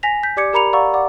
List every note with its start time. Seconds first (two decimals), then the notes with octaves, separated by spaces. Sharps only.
0.03 G#5 A#6 B6 F7
0.23 G#5 G6 B6
0.37 G4 D5 D6 G#6 C#7
0.53 G4 A#4 A#5 B5 C#7 F7
0.73 D5 F5 F#5 A#5 C#6 E6
0.94 D5 F#5 D6